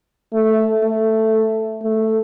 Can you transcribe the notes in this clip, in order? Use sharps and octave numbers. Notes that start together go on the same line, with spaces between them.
A3
A3
A3